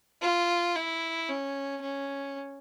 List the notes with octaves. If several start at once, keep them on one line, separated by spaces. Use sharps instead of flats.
F4
E4
C#4
C#4